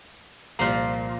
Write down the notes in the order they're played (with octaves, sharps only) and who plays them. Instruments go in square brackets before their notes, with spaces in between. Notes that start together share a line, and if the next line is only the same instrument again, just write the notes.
[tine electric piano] C2 A#5 [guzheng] A#2 F3 A#3